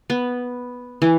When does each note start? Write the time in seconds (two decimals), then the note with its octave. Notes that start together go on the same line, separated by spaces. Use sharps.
0.10 B3
1.02 E3